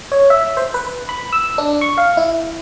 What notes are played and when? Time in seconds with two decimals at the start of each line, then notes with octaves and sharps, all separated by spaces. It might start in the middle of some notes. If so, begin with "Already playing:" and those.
0.12 C#5
0.30 E5
0.57 C5
0.74 B4
1.09 B5
1.33 E6
1.58 D4
1.81 C#6
1.98 F5
2.17 E4